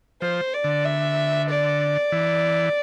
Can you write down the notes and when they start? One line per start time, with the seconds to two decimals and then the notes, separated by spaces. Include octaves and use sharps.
0.22 F3 C5
0.53 D5
0.64 D3
0.85 E5
1.48 D5
2.12 E3